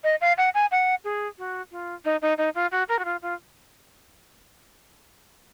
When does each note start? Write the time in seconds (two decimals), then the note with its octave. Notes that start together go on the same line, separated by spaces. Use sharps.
0.04 D#5
0.21 F5
0.38 F#5
0.54 G#5
0.72 F#5
1.04 G#4
1.38 F#4
1.72 F4
2.05 D#4
2.22 D#4
2.38 D#4
2.55 F4
2.72 F#4
2.89 A#4
2.99 F#4
3.05 F4
3.22 F4